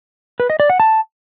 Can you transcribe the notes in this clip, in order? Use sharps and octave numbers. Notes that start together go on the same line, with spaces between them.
B4
D#5
D5
F#5
A5